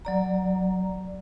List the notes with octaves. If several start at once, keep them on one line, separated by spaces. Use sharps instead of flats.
F#3 D5 A#5